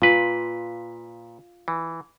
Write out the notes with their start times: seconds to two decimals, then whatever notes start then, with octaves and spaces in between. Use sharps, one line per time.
0.02 A#2 F4 B4
1.68 E3